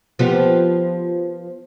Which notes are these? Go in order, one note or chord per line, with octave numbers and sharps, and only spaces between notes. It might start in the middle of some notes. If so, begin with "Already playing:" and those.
F3 B3 G4